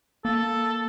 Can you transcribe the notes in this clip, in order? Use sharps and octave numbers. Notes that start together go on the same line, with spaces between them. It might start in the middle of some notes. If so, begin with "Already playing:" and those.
A#3 A4